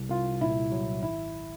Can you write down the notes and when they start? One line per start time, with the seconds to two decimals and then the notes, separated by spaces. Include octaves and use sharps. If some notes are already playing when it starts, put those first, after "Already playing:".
Already playing: C2
0.10 C2 F4
0.41 A#2 E4
0.72 F#3
1.02 G#1 E4